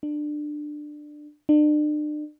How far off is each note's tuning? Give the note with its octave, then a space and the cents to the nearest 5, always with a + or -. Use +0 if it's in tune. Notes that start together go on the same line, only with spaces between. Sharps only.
D4 +20
D4 +40